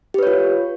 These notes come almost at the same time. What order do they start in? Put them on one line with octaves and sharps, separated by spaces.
G4 B4 C#5 F4